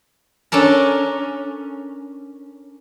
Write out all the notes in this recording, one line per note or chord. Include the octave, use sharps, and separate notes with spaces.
C#4 D4 A4 A#4